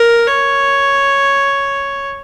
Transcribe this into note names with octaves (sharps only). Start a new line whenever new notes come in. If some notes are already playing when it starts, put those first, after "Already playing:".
Already playing: A#4
C#5